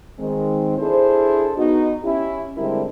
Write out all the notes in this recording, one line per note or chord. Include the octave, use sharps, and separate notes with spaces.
D#3 G#3 C4
D4 E4 G#4 A4 C5
B3 D#4 F#4
C#4 E4 G4
D3 G3 G#3 C4 E4 A#4